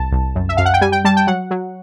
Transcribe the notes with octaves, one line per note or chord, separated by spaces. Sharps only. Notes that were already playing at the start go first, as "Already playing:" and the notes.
Already playing: C2 A5
C2
F#2
E5
F#2 F5
F#5
G5
G3 G#5
G5
G3 A5
G5
F#3 F#5
F#3